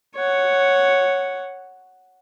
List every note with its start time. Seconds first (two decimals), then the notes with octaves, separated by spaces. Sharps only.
0.16 C#5 F#5